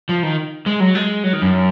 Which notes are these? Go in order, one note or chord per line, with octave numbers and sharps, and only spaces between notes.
F3
D#3
G#3
F#3
G#3
F#3
D#3
F#2